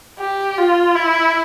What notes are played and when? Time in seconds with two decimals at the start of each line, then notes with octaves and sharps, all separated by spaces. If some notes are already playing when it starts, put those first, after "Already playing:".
0.19 G4
0.58 F4
0.95 E4